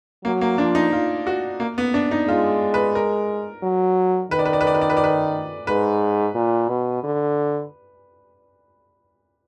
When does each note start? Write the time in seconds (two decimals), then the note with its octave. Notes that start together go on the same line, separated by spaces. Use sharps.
0.25 F#3 A#3
0.41 A#3
0.58 F3 D4
0.75 D#4
0.93 F4
1.27 F#4
1.60 A#3
1.78 B3
1.94 D4
2.11 D#4
2.27 G#3 F4
2.74 B4
2.95 A#4
3.63 F#3
4.31 D#3 B4
4.39 D5
4.45 B4
4.53 D5
4.61 B4
4.67 D5
4.75 B4
4.81 D5
4.90 B4
4.97 D5
5.04 B4
5.67 G#2 B4
6.35 A#2
6.68 B2
7.04 D3